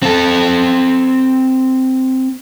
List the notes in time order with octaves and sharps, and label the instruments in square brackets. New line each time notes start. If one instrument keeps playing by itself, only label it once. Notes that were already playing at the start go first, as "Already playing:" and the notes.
[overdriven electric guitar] C4 A4